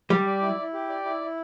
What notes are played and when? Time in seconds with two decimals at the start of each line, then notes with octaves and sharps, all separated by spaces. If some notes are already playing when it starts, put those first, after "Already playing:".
0.10 G3 G4
0.26 D5
0.42 E4
0.58 E4
0.73 G4
0.89 D5
1.05 E4
1.20 E4